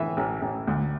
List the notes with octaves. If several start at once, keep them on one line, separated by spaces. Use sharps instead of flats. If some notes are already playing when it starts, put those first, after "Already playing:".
Already playing: A2 E3 E5
A1
A1
D2